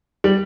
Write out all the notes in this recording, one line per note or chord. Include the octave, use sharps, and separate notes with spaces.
G3